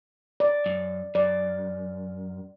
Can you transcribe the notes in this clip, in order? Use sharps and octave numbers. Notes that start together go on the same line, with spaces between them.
D5
F#2
F#2 D5